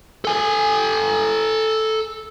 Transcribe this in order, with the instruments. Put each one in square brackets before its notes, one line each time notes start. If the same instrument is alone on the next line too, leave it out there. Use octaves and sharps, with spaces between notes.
[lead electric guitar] A4 G#5